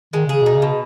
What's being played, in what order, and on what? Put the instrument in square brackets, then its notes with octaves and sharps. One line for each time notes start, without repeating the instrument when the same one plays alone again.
[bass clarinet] D#3 [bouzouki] G#3
[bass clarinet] C#3 [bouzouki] G#4
[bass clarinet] B2
[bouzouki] D#4
[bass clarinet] C#3
[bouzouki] B2